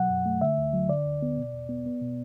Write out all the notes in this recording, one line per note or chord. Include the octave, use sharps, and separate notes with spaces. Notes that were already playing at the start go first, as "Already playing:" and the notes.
Already playing: B2 F#3 F#5
F#2
A3
D3 E5
D2
F#3
D3 D5
D2
B3
B2
E2
B3
B3
B2